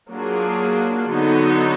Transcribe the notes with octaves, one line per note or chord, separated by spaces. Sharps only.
F#3 A#3 D4 F4 G#4
D3 F#3 B3 D#4